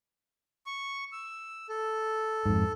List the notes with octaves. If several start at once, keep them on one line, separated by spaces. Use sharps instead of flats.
C#6
E6
A4
F2 G#2